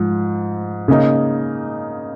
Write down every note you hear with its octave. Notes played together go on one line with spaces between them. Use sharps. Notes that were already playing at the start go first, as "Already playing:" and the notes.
Already playing: G#2 F3
C#3 A#3 D#4